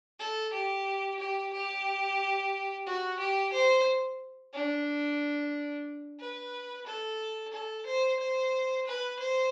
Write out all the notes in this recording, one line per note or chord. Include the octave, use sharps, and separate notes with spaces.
A4
G4
G4
G4
F#4
G4
C5
D4
B4
A4
A4
C5
C5
B4
C5